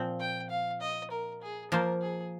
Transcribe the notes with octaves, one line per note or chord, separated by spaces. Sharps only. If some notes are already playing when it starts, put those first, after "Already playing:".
Already playing: A#2 F3 C4
G5
F5
D#5
A#4
G#4
F3 A#3 F4 A#4 C5
G#4